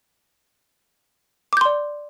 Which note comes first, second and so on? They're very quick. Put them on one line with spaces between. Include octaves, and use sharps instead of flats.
D6 G6 C6 D5